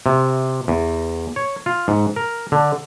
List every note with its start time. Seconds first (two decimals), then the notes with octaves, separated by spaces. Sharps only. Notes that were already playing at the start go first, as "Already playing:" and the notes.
0.06 C3
0.68 E2
1.36 C#5
1.66 F4
1.88 G#2
2.16 A#4
2.52 D3